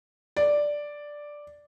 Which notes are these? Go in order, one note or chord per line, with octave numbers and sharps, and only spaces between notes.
D5